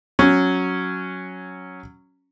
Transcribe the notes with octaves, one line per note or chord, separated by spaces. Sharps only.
F#3 C#4